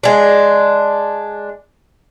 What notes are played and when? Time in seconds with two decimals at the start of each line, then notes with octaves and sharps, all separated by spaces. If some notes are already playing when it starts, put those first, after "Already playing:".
0.03 G#3 D4